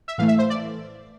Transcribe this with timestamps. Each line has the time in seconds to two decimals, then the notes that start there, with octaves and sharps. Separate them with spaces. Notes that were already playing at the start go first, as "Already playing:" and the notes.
0.08 E5
0.18 A2 E3 A3 F5
0.28 E5
0.39 C5
0.50 D5